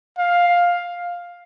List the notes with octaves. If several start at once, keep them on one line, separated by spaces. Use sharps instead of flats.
F5